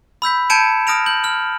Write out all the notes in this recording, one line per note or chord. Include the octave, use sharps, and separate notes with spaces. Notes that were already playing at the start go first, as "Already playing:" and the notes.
B5 E6 G6 B6
A5 G6 G#6 C#7 D7 E7
D#6 F6 A#6 D7 F7
G6 F#7
F6 F#7